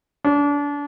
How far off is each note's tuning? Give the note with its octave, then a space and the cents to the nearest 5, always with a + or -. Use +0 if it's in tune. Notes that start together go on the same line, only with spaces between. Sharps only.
D4 -30